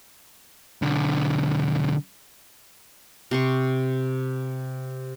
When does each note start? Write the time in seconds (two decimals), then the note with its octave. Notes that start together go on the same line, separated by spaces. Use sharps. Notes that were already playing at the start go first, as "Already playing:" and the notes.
0.82 B1 D3
3.31 C3 C6 C#6